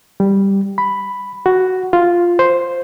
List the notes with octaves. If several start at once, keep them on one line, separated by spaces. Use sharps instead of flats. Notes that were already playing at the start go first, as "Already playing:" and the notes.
G3
B5
F#4
F4
C5